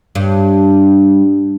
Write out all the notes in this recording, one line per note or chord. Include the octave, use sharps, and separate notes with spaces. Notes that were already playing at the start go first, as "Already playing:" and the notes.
G2